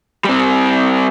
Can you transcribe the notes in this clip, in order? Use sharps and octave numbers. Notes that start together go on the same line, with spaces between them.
G3 C4